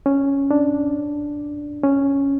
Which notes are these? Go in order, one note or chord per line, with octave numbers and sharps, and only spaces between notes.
C#4
D4
C#4